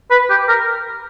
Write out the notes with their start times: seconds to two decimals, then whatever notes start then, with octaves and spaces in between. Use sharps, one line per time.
0.11 B4
0.30 G4
0.48 A#4